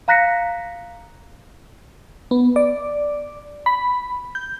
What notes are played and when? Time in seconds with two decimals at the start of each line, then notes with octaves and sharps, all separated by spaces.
0.08 F5 A#5 F#6 A#6 B6 C#7
2.31 B3
2.56 D5
3.66 B5
4.35 G6